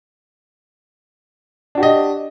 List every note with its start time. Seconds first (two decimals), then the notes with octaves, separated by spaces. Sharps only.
1.75 D4
1.78 F#4
1.80 G4
1.83 D#5